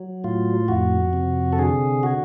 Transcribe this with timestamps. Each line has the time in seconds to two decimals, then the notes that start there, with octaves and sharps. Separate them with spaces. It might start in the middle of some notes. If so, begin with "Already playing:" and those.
Already playing: F#3
0.24 A2 F4
0.68 F2 F#4
1.13 C3
1.53 A4
1.58 D3 G#4
2.03 F#4